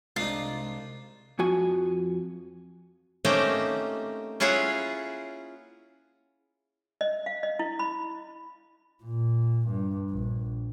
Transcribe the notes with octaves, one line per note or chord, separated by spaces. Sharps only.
C2 G#3 D4 D#4 F4
F2 F3 F#4 G#5
A3 A#3 C4 C#4 D#4 G4
C#4 E4 F4 G#4 C#5 F#5
D#5
F5
D#5
E4
B5
A#2
G2
A#1